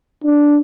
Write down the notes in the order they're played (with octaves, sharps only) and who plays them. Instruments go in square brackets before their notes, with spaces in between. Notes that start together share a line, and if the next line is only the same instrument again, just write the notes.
[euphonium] D4